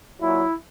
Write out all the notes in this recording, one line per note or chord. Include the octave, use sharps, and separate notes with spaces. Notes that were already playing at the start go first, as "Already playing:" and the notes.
A#2 F#3 E4